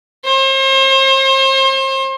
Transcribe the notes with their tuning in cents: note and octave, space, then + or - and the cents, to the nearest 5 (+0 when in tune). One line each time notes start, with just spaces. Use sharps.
C5 +40